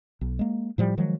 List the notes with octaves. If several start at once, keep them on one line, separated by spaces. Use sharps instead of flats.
B1
G#3 A#3
A2 F3 G3
D#3 F3 F#3 G#3